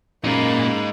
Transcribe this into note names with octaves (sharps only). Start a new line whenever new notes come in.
F#2 A#2 G#3 A#3 D#4 B5